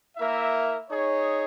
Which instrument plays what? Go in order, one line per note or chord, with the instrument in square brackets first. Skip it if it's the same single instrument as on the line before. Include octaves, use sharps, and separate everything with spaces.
[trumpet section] A#3 E4 A#4 E5
D#4 G#4 C#5